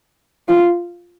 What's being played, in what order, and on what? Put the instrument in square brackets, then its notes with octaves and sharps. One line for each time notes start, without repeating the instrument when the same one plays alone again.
[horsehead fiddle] F4